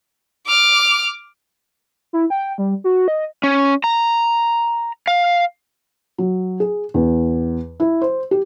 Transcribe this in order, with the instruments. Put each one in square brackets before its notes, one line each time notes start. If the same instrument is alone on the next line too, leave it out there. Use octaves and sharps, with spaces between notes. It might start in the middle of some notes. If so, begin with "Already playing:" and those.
[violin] D6 F6
[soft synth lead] E4
G5
G3
F#4
D#5
[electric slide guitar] C#4
A#5
F5
[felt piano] F#3
G#4
E2
E4
C5
G4